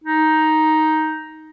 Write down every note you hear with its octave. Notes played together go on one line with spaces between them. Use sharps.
D#4